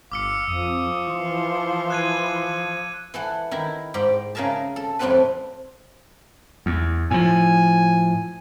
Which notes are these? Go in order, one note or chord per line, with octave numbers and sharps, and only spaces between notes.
G1 F5 D6 E6 C#7
F2 F3 D#6
E3 C6
F#6 G#6 D#7
E3 A4 F#5
D#3 E4
G#2 G4 D5 G5
C#3 G#4 A#4 E5 A5
A4
F2 A2 G3 C4 A4 B4
E2
A2 F3 G#5